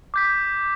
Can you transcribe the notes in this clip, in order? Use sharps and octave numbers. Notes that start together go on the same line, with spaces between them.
D6 G6 B6